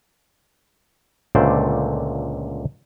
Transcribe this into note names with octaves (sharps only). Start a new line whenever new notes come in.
C#2 A#2 D3 A3 C5 D5